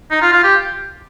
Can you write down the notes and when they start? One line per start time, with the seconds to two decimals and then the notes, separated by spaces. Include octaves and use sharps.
0.11 D#4
0.22 F4
0.33 F4
0.44 G4